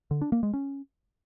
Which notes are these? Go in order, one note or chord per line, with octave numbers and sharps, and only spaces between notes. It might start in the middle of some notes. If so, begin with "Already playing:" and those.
D3
D4
A#3
G#3
C#4